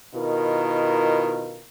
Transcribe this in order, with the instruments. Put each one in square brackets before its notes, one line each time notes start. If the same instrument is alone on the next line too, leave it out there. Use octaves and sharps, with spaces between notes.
[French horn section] B2 D#3 E4 F4 A#4